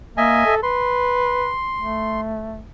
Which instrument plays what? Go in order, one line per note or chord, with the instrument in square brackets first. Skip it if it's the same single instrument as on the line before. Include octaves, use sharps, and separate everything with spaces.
[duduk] A#3 [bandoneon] D#5 E5 G#5
[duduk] A4
[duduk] B4 [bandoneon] C6
[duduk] A3